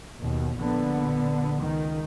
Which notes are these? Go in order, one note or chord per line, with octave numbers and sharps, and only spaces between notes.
D#2 B2
A#1 A#2 D3 B3
C#2 D#3